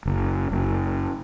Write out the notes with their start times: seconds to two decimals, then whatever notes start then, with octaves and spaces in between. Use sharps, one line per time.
0.06 F#1
0.52 F#1